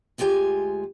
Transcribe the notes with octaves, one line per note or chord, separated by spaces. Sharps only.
D2 G#3 F4 G4 G#5